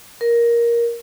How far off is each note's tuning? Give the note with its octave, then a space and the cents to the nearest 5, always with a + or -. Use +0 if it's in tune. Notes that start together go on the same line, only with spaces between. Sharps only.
A#4 +10